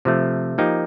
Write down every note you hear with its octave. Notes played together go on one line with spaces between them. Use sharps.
C3 F3 A3
F3 A#3 D#4 G4